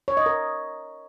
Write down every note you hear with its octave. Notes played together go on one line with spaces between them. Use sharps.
C#5
D#5
A#4